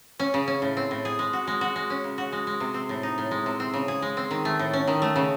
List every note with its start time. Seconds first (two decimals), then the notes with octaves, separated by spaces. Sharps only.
0.20 C#4
0.34 C#3
0.48 C#4
0.62 A2
0.77 C4
0.91 A2
1.05 G#4
1.19 G#3
1.33 F#4
1.47 G#3
1.61 F#4
1.76 G#3
1.90 C#4
2.04 C#3
2.18 F#4
2.32 G#3
2.47 G#3
2.60 C3
2.74 C4
2.89 A2
3.03 D#4
3.18 A2
3.31 G#3
3.46 C3
3.60 C4
3.74 C#3
3.88 G#4
4.02 G#3
4.17 C4
4.31 D#3
4.45 A3
4.59 A2
4.73 C#4
4.87 D#3
5.02 A3
5.16 C#3